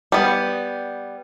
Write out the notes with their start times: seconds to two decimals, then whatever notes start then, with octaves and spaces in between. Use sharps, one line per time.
0.12 G3 B3